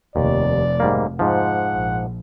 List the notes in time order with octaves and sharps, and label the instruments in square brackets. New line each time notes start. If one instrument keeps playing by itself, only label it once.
[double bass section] F1 [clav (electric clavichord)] D#2 [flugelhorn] D5
[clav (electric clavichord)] G#2 G3 A#3
[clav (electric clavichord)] G#2 F3 [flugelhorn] F#5
[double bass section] A#1